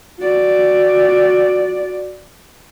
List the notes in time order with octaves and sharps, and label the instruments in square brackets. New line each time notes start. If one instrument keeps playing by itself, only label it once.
[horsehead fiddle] F#4 D5